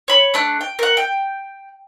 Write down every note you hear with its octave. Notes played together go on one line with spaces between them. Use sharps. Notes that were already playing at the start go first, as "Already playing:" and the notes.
C#5 B5
A3 D4 F#6
G5
A#4 F#5
G5